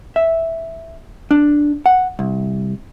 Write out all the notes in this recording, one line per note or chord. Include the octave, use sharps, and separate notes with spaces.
E5
D4
F#5
C2